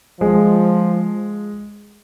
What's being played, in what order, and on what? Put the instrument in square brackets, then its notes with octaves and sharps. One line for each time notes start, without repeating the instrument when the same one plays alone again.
[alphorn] F3 [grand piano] G#3